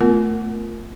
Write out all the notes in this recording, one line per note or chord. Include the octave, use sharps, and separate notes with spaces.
A3 B3 F4 A#4